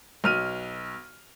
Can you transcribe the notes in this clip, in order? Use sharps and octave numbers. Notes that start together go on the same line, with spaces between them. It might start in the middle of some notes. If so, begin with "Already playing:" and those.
B1 F6 D#7